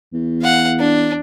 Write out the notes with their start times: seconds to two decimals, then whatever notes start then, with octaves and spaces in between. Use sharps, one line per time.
0.13 E2
0.42 F5 F#5
0.79 D4